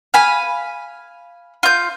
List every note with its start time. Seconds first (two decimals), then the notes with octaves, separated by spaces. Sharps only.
0.14 F5 G#5 B5
1.63 F4 G6